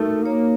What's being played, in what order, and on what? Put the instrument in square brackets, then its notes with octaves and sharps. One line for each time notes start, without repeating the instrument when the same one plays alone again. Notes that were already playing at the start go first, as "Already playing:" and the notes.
Already playing: [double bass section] A3 [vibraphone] D#4 F#4 A#4
[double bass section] A#3 [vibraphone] C#5